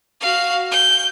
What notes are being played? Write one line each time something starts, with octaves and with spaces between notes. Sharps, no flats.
F#4 F5
G6